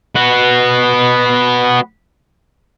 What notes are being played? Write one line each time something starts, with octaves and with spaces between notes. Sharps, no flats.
B3 F#4